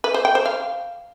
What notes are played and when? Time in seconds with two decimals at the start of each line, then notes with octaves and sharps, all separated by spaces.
0.04 B4
0.14 C5
0.25 G5
0.35 C5
0.46 F5